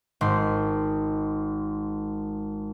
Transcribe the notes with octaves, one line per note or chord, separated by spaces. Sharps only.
G#1 C6